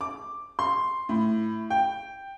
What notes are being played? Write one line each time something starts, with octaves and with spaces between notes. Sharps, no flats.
D6
C6
A2
G5